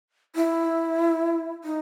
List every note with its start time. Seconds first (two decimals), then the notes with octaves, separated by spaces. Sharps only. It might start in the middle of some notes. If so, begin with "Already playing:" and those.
0.36 E4
1.64 D#4